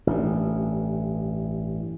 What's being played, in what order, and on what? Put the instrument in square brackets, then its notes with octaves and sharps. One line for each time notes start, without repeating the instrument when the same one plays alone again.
[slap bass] A1 G2